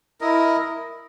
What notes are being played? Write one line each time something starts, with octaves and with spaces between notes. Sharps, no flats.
E4 A#4 D#5